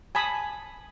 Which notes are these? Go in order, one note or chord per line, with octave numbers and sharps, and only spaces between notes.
G#5 A5 B5 D#6